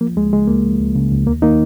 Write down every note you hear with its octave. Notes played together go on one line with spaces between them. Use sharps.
F3 A#3
C#2 G#3
C#3 G#3
C#2 A#3
F3
C#2
C#3
C#2
D#2 A#3
D#3 A#3 D#4